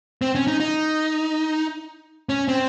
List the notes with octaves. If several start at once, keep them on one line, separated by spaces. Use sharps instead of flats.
C4
C#4
D#4
D#4
C#4
C4